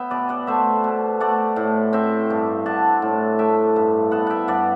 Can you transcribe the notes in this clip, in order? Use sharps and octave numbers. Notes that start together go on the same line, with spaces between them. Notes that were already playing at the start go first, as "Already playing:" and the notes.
Already playing: B3 E5 G5
B2 B4 D5
D5 F#5
A3 C5 E5
B2
A3 D5 F#5
A2
C4 E5 G5
G2
D4 F#5 A5
A2
A3 E5 G5
G2
B3 F#5 A5
E5 F#5 G5
G2 D5 F#5